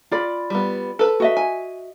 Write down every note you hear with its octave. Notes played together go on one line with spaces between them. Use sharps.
F4 D5 B5
G3 B3
A4 B4
F#4 D#5 E5
G#5